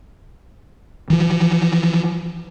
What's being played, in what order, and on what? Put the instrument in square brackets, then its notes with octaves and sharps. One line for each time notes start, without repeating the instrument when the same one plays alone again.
[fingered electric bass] E3 F3